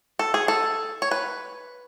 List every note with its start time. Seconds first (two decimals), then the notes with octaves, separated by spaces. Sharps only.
0.19 A4
0.34 G#4
0.48 A4
1.02 C#5
1.11 B4